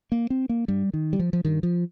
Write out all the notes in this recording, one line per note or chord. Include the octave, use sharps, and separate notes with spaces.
A#3
C4
A#3
G2 G3
D#3
G3
F3
F3
G2 D#3
F3